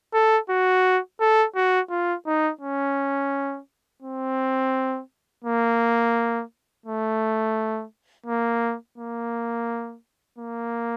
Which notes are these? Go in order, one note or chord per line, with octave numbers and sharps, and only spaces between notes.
A4
F#4
A4
F#4
F4
D#4
C#4
C4
A#3
A3
A#3
A#3
A#3